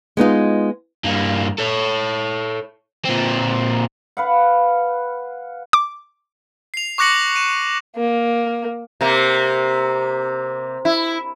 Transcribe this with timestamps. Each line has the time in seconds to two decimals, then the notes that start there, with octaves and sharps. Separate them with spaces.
0.17 G#3 B3 D#4 F4
1.05 G2 A#3
1.58 A4 C#5
3.05 A#2 C4
4.17 B4 F5 F#5
5.73 D6
6.74 C7 F7
6.98 C#6 D6 F#6 A#6 C#7 F#7
7.36 D#7 E7
7.97 A#3
9.01 C3 A#3
10.85 E4